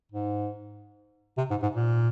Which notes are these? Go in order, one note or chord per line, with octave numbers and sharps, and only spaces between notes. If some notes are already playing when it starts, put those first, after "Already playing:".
G#2
C3
G#2
G#2
A#2